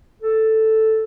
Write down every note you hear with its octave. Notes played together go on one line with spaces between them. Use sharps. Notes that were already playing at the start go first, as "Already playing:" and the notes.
A4